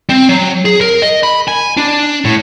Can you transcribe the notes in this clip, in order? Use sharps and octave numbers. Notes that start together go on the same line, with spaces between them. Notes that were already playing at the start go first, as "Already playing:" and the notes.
C4
F#3
G#4
A#4
D#5
B5
G#5
D4
A2